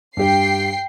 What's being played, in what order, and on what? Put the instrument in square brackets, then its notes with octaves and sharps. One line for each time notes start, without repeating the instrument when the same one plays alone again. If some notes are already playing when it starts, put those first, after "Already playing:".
[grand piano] G2 G4 [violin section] G5 C7